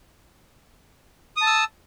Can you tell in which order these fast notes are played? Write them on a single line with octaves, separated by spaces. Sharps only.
D#6 A5 E6